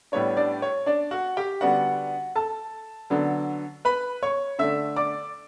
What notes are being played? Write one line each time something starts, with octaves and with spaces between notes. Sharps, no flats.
A2 G3 B3 D4 C#5
D4 D5
C#5
D4 D5
F#4 F#5
G4 G5
D3 G3 B3 D4 F#4 F#5
A4 A5
D3 F#3 B3 D4
B4 B5
C#5 C#6
D3 A3 D4 E5 E6
D5 D6